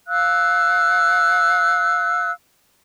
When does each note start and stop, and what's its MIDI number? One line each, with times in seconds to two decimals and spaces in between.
0.08 2.31 77
0.08 2.31 88
0.08 2.31 90